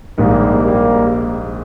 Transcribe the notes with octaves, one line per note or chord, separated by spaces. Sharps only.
A#1 G#2 D#3 G3 A#3
G3 A#3